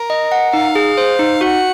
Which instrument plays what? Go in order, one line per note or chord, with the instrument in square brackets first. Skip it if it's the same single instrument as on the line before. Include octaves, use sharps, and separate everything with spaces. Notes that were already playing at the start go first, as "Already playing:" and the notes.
Already playing: [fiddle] A#4
[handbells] D#5
F#5
[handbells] D#4 [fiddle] F5
[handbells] G#4
C5
D#4
[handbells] F#4 [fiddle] F#5